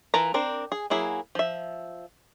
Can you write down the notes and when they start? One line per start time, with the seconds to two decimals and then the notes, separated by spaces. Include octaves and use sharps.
0.14 E3 F4 A#4 A5 A#5
0.34 C4 D4 A#4 C5
0.72 G#4
0.90 F#3 A#3 E4 G#4
1.35 F3 E5